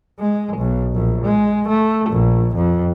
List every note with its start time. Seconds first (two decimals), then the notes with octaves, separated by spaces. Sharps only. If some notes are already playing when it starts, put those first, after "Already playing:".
0.19 G#3
0.57 B1
0.93 A#1
1.25 G#3
1.69 A3
2.10 A#1
2.56 F2